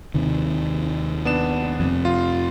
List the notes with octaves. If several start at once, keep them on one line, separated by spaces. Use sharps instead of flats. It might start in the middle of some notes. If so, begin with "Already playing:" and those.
D#2 C3 D#3
B3 D4 E7
F2 C3
F4